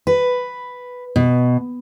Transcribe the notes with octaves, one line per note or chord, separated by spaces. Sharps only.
B4
B2